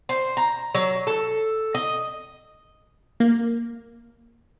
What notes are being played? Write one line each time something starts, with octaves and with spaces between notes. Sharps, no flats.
C5
A#5
F#3
A4
D#5
A#3